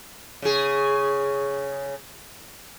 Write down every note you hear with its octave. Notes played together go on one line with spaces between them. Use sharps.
C#3 G#4